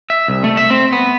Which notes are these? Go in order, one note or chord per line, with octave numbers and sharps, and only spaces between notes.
E5
C2
A3
E5
C4
B3